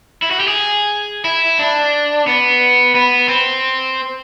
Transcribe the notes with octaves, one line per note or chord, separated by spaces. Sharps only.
E4
F#4
G4
G#4
E4
D4
B3
B3
C4